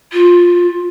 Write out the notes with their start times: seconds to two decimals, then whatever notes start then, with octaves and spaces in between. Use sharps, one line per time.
0.12 F4